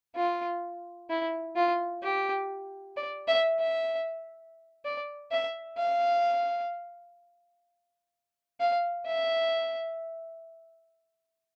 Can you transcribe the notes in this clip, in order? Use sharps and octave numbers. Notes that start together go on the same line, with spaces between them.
F4
E4
F4
G4
D5
E5
E5
D5
E5
F5
F5
E5